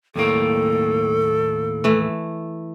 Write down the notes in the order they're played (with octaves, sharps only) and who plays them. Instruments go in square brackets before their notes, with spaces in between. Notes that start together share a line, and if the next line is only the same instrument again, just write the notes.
[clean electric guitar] D#2 A2 A#3 [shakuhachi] A4
[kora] E3 A3